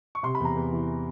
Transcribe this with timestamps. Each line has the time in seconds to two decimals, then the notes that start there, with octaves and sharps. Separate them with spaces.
0.15 C#6
0.23 C3 C6
0.35 B5
0.40 E2 A#5
0.56 E2
0.72 E3